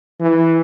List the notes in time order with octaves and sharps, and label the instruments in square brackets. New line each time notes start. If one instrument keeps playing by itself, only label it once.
[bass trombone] E3